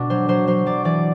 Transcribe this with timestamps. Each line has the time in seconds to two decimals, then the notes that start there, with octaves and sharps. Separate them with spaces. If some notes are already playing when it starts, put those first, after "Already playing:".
Already playing: B2 D4 F#4
0.10 F#3 C5
0.28 F#3 C5
0.47 F#3 C5
0.66 F#3 D5
0.85 E3 D5